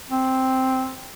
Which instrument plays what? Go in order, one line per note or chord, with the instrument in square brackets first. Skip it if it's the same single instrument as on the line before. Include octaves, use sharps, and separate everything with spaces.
[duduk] C4